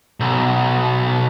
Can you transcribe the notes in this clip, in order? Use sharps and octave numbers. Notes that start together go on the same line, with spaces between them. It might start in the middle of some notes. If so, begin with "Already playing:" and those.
B1